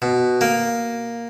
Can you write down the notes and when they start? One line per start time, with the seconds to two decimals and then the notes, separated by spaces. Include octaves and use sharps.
0.02 B2
0.41 A#3